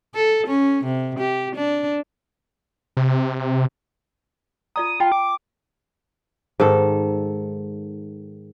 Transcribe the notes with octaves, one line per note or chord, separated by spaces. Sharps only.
A4
C#4
C3
G4
D4
C3
F4 D5 A#5 D#6
F4 G5 A5 B5
D6
G#2 D#3 A4